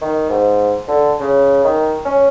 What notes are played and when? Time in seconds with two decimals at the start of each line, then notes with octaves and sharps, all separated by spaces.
0.01 D#3
0.29 G#2
0.88 D3
1.20 C#3
1.64 D#3
2.05 C#4